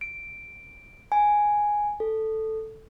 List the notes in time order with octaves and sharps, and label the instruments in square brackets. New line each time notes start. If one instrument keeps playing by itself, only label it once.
[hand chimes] D7
G#5
A4